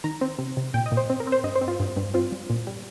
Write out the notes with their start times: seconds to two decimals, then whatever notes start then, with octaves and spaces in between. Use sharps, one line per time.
0.04 D#3 A#5
0.21 C4
0.38 C3
0.57 C3
0.74 A#2 G5
0.86 D#5
0.92 A#2
0.97 C5
1.10 C4
1.20 A#4
1.27 C4
1.32 C5
1.43 G2 D#5
1.56 C5
1.61 C4
1.68 F4
1.80 G2
1.96 G2
2.14 C4 F4
2.32 G3
2.50 A#2
2.67 G3